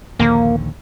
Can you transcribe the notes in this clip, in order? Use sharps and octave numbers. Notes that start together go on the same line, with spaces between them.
A#1 D#2 D3 A#3